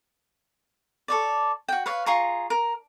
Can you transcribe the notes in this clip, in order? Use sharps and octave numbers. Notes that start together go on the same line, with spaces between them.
A4 C#5 D5
F#4 G5
B4 C#5 F5
F4 G#4 A#5 C#6
A#4